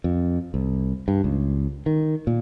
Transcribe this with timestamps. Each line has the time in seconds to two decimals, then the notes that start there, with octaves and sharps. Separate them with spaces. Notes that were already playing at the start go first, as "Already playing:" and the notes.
0.04 F2
0.54 C2
1.08 G2
1.24 C#2
1.86 D#3
2.27 A#2